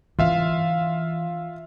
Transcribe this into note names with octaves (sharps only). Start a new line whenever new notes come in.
E3 D4 F4 E5 F5